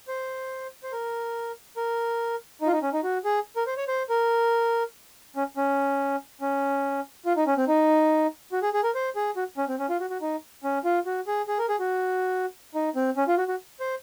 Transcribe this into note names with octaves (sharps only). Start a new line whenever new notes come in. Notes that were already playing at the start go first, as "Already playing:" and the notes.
C5
C5
A#4
A#4
D#4
F4
D#4
C#4
D#4
F#4
G#4
A#4
C5
C#5
C5
A#4
C#4
C#4
C#4
F4
D#4
C#4
C4
D#4
F#4
G#4
G#4
A#4
C5
G#4
F#4
C#4
C4
C#4
F4
F#4
F#4
D#4
C#4
F4
F#4
G#4
G#4
A#4
G#4
F#4
D#4
C4
C#4
F4
F#4
F#4
C5